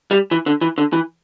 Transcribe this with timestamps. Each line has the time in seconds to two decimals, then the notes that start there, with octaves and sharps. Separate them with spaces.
0.11 G3
0.31 E3
0.46 D3
0.61 E3
0.78 D3
0.93 E3